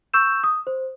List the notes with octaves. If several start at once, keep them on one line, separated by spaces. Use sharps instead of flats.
C#6 E6 G6 E7
D#6
C5